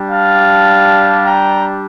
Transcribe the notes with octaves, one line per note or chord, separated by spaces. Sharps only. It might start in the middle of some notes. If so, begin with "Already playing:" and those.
Already playing: G3 D4 G4
F5 A5
G5 A#5